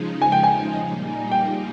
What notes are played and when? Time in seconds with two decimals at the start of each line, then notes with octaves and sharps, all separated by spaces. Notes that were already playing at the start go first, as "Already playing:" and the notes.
Already playing: C#3 F3 G#3 D#4
0.22 G#5
0.32 G5
0.44 G#5
0.76 A#2 G3 A#3 D#4
1.32 G5